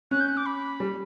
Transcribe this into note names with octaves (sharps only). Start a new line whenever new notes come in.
C#4 F#6
G6
F#6
D6
B5
G3